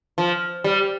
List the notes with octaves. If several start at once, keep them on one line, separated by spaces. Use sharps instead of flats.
F3
G3